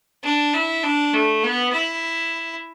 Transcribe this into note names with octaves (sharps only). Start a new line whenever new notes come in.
D4
E4
D4
A3
B3
E4